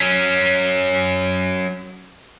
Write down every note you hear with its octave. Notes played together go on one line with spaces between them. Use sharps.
F#3 C#4